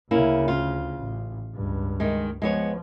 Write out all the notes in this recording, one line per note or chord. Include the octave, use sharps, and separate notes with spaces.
D2 C#3 A#3 C#4 E4
F4
A1
C#2 G2
D#3 G#3
F3 G#3 B3 C#5